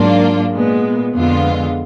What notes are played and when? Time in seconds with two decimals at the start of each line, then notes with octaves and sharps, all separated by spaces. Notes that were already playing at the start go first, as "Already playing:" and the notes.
Already playing: G#2 F#3 A#3 D4 F4
0.52 A#2 G#3 B3
1.14 F2 D3 G#3 B3 F4